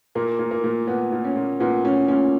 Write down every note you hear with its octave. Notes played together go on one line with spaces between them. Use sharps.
A#2 A#3
A#2
A#3
A#2
A#2 B3
A#2
C#4
A#2
A#2 B3
A#2 C#4
A#2 C#4